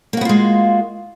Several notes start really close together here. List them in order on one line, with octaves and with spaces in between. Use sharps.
A#3 F#4 B3 F4 G#3